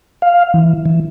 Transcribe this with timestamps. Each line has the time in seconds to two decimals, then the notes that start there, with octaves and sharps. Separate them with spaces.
0.22 F5
0.54 E3
0.86 E3